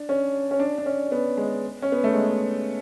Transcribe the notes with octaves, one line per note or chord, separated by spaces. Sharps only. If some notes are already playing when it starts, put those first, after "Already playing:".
Already playing: D4
C#4
C#4
D4
D4
C#4
B3
G#3
C#4
B3
A3
G#3